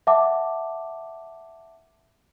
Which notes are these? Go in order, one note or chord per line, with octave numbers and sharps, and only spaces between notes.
E5 F#5 A5 D6